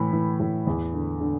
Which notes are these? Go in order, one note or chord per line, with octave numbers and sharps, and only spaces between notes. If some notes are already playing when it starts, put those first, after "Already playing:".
Already playing: A2 E3 B5
E3
A2
E2
D3
D3